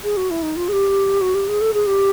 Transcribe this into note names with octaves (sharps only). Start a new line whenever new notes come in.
G#4
F#4
E4
D#4
F4
G#4
G4
F#4
G4
G#4
A4
G#4
G4